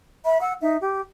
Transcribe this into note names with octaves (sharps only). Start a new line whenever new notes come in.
E5 B5
F#5 E6
D#4 E5
G4